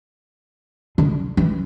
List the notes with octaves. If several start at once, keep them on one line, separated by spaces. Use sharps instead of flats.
D3
E3